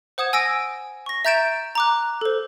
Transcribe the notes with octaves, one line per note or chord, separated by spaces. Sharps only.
C5 F#5 D#6 G#6 E7
G#5 E6 A#6 D7 D#7
C#6 A#6
E5 A#5 G6 A6 D7 E7
A#5 D6 F#6
A4 C5